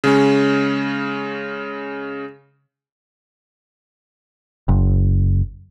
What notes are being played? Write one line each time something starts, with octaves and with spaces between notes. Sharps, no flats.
C#3 G#3 C#4
F#1